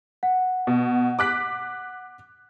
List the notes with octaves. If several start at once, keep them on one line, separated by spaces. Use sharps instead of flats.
F#5
B2
D6 F#6 B6